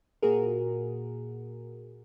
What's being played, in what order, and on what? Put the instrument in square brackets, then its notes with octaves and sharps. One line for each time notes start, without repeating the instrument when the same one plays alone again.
[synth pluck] A#2 F#4 G#4 A#4